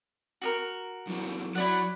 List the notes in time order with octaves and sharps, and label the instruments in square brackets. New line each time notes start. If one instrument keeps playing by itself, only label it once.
[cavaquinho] F#4 G4 A#4
[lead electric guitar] F#2 E3
[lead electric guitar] F#3 [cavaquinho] E4 D5 F#5